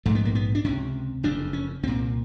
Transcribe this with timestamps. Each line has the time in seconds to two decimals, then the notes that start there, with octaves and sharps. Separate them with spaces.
0.06 A#1 G#2 A3
0.15 B3
0.25 A#3
0.35 B3
0.55 D4
0.65 C#2 C3 C#4
1.23 F#1 F2 C#3 D4
1.53 C#4
1.83 C2 C4
1.87 A#2